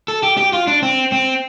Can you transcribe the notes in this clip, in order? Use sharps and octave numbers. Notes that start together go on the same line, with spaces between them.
A4
G4
G4
F4
D4
C4
C4